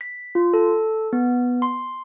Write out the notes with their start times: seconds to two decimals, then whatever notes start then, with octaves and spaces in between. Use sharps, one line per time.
0.01 B6
0.35 F4
0.54 A4
1.13 B3
1.62 C6